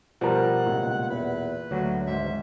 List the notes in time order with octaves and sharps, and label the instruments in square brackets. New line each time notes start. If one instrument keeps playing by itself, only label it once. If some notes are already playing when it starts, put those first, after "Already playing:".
[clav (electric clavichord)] B2 G3 [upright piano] F3 A#4 [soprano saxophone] F#5
[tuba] C#2 [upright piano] A#2
[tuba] E2 [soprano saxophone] B4
[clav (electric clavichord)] D2 [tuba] F#3
[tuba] G#1 [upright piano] G#2 [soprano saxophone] E5